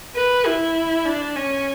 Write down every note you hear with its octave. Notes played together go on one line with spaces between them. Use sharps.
B4
E4
D4
C#4